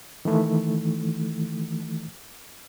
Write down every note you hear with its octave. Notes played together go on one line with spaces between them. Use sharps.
D#3 E3 A3